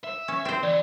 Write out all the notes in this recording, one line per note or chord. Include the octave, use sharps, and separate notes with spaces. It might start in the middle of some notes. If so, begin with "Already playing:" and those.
E5
C#4
C4 C5
E3 D5